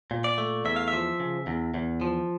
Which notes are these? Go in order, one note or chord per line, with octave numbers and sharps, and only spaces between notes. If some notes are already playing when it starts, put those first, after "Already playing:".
A#2
D5
A3
E2 E5
F5
E5
F3
C#3
E2
E2
F3